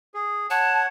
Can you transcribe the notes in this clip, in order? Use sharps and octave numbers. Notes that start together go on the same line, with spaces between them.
G#4
C#5 F#5 A5